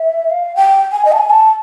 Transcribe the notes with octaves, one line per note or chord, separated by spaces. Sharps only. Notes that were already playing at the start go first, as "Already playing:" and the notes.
Already playing: E5
F5
G5
G#5
D#5
A5
G#5
A5